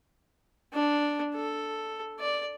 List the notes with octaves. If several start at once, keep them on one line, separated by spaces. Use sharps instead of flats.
D4
A4
D5